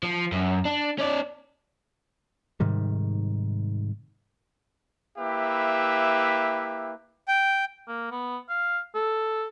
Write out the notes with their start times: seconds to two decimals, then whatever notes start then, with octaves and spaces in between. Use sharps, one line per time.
0.03 F3
0.32 F#2
0.65 D4
0.99 C#4 D5
2.60 G#2 C3 D#3 G3
5.18 A#3 E4 G4 B4 E5
7.28 G5
7.88 A#3
8.11 B3
8.49 F5
8.95 A4